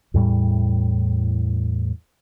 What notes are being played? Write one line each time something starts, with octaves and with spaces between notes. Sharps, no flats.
E2 A2 G3